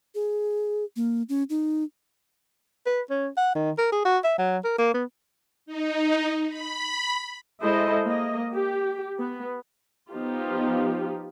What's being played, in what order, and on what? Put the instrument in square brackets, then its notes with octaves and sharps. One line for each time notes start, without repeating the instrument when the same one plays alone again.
[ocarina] G#4
A#3
C#4
D#4
[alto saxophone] B4
C#4
F#5
D#3
A#4
G#4
F#4
E5
F#3
A#4
A#3
B3
[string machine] D#4
B5
[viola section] G#3 E4 A4 C5 D#5
A#3 D#5
G4
B3
F3 B3 D#4 F4 G4